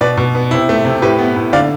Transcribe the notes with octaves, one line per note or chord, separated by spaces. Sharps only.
B2 B4 D5
B2
B3
C3 E4
A3
C3
A2 G4 B4
B3
A2
D3 D5 F5